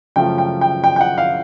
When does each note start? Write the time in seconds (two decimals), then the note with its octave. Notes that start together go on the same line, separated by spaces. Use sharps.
0.16 F#2 C#3 F3 A3 G5
0.38 G5
0.61 G5
0.84 G5
0.96 G5
1.01 F#5
1.18 F5